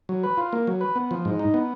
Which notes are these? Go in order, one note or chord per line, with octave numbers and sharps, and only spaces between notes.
F#3
B4
F4
A#3
F#3
B4
B3
F3
G#2
D#4
B3